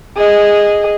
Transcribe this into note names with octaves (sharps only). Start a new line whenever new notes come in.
G#4 D#5